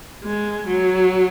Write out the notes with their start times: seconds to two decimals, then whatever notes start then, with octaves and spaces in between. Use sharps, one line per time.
0.24 G#3
0.67 F#3